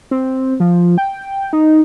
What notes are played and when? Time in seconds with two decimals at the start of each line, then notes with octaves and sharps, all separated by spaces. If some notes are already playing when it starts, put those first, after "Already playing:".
0.11 C4
0.60 F3
0.98 G5
1.53 D#4